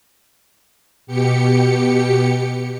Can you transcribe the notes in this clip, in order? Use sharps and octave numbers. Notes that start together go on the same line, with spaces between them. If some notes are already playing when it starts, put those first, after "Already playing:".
B2 G4 C#7